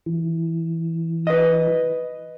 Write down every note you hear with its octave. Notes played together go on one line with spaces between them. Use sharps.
E3
B4 D#5